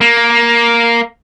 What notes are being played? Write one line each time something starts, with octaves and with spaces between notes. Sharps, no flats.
A#3